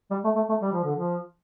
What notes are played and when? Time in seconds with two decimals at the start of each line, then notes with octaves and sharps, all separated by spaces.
0.11 G3
0.24 A3
0.36 A3
0.49 A3
0.62 G3
0.73 F3
0.84 D3
0.96 F3